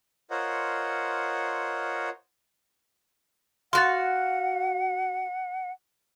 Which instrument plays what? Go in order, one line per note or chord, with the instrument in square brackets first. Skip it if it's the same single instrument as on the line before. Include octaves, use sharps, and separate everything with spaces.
[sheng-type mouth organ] F4 A#4 C5 C#5 D#5 F#5
[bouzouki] F#4 F5 [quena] F#5 [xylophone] C6 A6